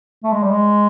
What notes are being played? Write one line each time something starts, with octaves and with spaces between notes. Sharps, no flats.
A3
G#3
G3
G#3